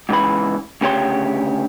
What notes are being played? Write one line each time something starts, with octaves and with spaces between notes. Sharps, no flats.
G#2 C#3 E3 B5
D2 C#3 G4 C#5 C6